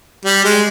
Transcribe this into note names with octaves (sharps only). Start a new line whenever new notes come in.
G3
G#3